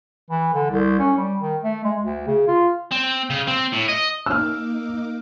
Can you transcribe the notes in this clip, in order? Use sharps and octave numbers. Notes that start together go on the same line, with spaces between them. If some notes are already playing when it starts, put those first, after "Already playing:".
E3
D3
C2
C#4
G3
D#3
A3
G#3
D2
C#3
F4
C4
C#3
C4
A2
D#5
A#3 D#4 D6 E6 F6